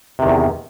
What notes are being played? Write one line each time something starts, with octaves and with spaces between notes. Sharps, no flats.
E2 C3 D#3